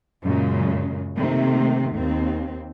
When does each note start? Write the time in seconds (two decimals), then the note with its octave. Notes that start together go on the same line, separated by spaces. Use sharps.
0.23 F#2 A#2 C#3 G#3
1.15 C3 D#3 A3 A#3 C4
1.93 D#2 C4